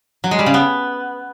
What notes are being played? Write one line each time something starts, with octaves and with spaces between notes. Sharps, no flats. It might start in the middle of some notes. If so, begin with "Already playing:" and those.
F#3
G#3
G3
C#3
B3